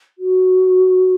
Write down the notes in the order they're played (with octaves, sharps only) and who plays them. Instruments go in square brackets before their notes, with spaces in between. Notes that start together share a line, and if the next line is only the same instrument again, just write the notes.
[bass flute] F#4